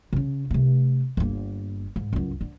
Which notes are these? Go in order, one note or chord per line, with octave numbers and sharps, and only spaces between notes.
C#3 C#4
C3 A3
G1 A#3
G#2
C#2 F#2
D3